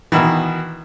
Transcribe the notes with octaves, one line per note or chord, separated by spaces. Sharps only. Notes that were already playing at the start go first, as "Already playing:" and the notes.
B2 D#3 E3